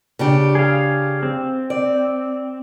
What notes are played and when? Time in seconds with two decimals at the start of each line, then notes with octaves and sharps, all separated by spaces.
0.19 C#3 D4 G4
0.55 G#4 F5
1.23 C4
1.70 D5